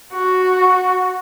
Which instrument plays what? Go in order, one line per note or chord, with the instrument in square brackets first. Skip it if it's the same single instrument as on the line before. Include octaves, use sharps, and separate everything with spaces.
[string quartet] F#4